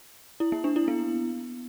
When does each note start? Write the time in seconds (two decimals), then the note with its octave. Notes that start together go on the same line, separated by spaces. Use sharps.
0.40 E4
0.52 A#3
0.64 D4
0.76 E4
0.88 B3